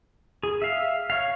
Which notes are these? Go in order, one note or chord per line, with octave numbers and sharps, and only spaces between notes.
G#4
E5 F5
C#5 F5